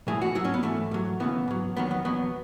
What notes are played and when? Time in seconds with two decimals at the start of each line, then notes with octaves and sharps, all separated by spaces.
0.07 B1 A2 E3 G#4
0.22 F#4
0.35 G#2 F#3 E4
0.45 C#4
0.54 B3
0.63 G#2 E3 A3
0.91 G#2 F#3
1.20 D#2 C#3 E3 B3
1.48 G#2 F#3
1.77 E2 D#3 F#3 B3
1.91 B3
2.05 E2 B2 F#3 B3